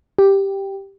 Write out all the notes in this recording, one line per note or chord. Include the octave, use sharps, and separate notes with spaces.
G4